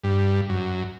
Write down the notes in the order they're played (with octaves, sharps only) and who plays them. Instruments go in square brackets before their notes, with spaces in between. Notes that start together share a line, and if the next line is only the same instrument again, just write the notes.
[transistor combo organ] G2
F#2